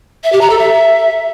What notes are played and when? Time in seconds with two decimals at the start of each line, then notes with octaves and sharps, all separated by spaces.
0.23 E5
0.32 G4
0.41 A#5
0.50 A4
0.58 E5